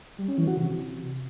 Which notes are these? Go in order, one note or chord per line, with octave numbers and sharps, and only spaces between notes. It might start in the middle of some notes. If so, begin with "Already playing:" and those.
G3
C#4
E3
F#4
C3